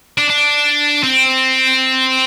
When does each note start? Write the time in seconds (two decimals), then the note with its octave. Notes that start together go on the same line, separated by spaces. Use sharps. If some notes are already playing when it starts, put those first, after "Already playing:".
0.18 D4
0.30 D4
1.04 C4